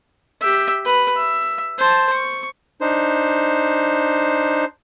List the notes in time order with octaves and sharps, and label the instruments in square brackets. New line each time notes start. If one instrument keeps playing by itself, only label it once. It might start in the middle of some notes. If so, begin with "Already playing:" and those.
[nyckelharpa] G4 E5
B4
E5
C5 A5
C#6
[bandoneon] D4 D#4 C5